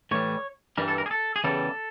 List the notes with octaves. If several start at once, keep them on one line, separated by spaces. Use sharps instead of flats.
A2 E3 G3 C#5
G2 E3 G3 A#4
A4
A#4
G#4
A4
G#4
E2 C#3 E3 G3 A4